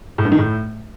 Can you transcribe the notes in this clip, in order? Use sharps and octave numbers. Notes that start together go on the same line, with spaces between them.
A2
G2
D#3
A2